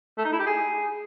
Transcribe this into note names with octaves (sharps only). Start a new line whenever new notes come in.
A3
D#4
E4
G4
G#4